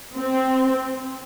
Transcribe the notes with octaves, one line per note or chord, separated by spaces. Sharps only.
C4